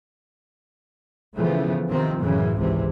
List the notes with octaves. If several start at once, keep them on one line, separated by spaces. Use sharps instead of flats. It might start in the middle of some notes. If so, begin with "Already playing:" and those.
C#3 E3 F3 A3 B3
C3 D#3 F3 C4
F#2 A2 C#3 E3
G#1 C#2 C3 E3